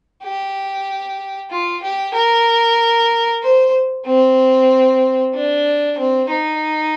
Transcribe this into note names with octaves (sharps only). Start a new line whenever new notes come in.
G4
F4
G4
A#4
C5
C4
D4
C4
D#4